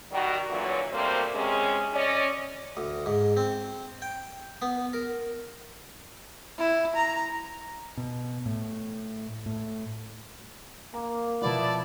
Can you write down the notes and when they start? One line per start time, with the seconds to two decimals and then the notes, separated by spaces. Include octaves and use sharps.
0.11 D#3 G3 F#4
0.49 A#2 D3 E3 F#3
0.92 D2 C3 G3 A#3 C5
1.35 C3 G#3 C#4
1.94 C#4 D5 D#5
2.77 D2
3.06 G#2
3.37 C4
4.02 G5
4.62 B3
4.93 A#4
6.59 E4
6.96 A#5
7.97 B2
8.46 A2
9.46 A2
10.94 A#3 A#5
11.41 B2 F3 B3 E4 D5 A5